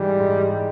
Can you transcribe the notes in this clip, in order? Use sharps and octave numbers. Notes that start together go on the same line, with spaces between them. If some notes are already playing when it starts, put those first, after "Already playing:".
Already playing: G#2 E3 G3 G#3
G#2